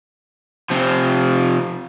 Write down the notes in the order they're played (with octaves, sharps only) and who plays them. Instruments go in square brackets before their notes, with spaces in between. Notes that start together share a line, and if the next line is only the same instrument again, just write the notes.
[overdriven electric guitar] C3 F3